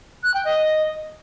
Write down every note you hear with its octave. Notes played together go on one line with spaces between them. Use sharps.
F#6
G5
D#5